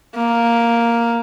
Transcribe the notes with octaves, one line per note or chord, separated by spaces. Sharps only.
A#3